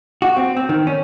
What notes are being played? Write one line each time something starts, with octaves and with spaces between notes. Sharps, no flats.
F#4
C4
C4
D#3
C#4